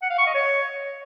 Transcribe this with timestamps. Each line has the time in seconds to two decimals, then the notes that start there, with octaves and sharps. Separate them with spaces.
0.02 F#5
0.10 F5
0.18 C#6
0.26 D#5
0.34 C#5